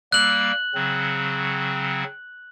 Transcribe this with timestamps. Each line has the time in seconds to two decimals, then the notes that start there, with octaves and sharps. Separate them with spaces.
0.12 G3 A#3 E6 F#6 F#7
0.75 C#3 F#3 C4